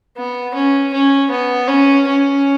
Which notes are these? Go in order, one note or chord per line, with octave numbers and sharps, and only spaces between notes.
B3
C#4
C#4
B3
C#4
C#4